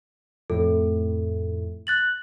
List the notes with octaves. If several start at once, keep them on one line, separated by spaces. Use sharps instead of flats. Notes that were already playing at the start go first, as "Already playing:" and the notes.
F2 A2 A4
F#6 A6 F#7